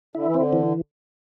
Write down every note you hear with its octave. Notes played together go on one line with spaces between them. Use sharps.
D3 E4
E3
D3 C4
E3